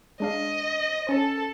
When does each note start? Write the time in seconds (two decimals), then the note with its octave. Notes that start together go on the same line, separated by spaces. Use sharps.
0.20 G#3 D4 D#5 F5
1.09 C#4 A4 A5